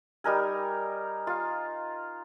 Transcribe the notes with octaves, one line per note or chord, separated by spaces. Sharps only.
G3 D#4 A#4 G#5
F4 F5